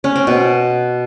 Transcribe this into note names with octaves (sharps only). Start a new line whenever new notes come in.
C#4
C4
B2